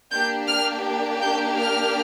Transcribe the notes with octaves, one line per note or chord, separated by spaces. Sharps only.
A#3 D4 G4 G6
F6
G6
F6